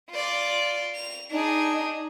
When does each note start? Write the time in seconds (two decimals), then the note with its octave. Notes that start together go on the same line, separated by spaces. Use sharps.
0.10 F4 D5
0.95 F7
1.31 D4 D#4 G#4